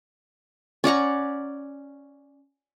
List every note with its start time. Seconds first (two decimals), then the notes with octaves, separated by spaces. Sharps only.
0.84 C#4 D5 F#5 A#5